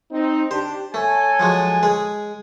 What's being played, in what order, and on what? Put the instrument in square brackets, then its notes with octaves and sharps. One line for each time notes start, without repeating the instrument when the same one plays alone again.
[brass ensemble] C4 D#4
[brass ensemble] D4 G4 [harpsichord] C5
[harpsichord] A3 [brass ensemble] A4 C#5 G#5
[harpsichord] F3 F#3 G#3
G#3 G#4